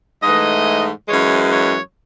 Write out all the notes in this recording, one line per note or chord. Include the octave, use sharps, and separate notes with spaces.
G#2 E3 A3 D#5
F#2 E3 G#3 C#5
C#5